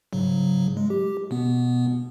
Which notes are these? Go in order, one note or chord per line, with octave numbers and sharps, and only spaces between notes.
G#2 C#3 F#3
G#3
G4
B2 B3